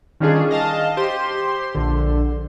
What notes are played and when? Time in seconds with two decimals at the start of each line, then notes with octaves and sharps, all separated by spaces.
0.20 D#3 G3 C#4 D4 F4 G#4
0.51 D#5 F5 A5
0.97 G4 C5 C6
1.75 A#1 D3